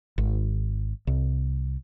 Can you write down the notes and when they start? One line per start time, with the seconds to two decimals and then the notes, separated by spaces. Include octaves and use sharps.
0.18 G#1
1.07 C2